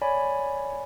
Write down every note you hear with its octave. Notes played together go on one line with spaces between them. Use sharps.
C#5 D5 G#5 B5